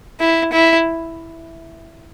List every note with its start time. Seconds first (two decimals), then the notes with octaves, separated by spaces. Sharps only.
0.21 E4
0.53 E4